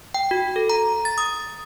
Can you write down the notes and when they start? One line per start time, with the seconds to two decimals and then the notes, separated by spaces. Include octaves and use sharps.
0.14 G5
0.31 F#4
0.56 A4
0.70 A#5
1.05 A6
1.18 D#6